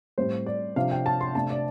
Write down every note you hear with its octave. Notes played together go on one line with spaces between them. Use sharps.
A2 G3 C4 C5
D5
C3 F3 D4 F5
G5
A5
C6
C3 A3 D4 A5
D5